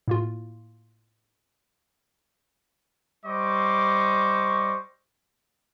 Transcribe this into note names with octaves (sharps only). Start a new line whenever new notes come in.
A2 A#3 F4
G3 C5 D#5 C#6 D6